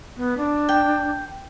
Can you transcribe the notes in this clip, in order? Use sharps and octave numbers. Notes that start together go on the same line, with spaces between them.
B3
D4
G5